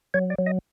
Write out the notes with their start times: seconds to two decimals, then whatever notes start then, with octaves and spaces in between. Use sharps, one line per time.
0.14 F#3 C#5
0.30 D5
0.38 F#3
0.46 D#5